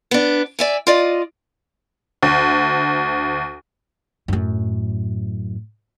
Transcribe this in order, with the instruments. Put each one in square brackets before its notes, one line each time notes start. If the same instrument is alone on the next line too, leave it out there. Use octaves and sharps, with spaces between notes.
[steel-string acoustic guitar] B3 D4
D5 E5 G#5
F4 D5 D#5
[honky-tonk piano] D2
[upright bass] F#2 A2